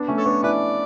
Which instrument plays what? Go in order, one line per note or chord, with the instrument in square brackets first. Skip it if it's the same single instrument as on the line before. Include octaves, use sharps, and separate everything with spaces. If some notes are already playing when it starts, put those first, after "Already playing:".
Already playing: [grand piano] B3 D4
A3 C#4
[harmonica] A4 C#5
[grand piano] B3 D4
[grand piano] C#4 E4 [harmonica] B4 D5